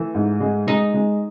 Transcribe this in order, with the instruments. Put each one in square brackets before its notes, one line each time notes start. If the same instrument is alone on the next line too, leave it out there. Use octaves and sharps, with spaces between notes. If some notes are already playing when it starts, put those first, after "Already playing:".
Already playing: [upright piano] E3 [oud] A3
[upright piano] G#2
G#3
[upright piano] G#3 [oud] D#4
[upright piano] G#3